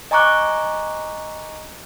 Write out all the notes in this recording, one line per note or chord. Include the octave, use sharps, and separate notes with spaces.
D#5 G#5 A#5 C#6 D6 F#6